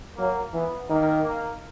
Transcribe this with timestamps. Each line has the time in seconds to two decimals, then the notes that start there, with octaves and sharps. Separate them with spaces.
0.17 F#3 A#3
0.53 E3 B3
0.89 D#3 A#3
1.24 A#3